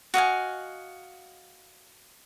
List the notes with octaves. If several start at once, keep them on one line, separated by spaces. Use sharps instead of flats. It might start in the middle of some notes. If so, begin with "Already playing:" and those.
F#4 D#5 F5 G#5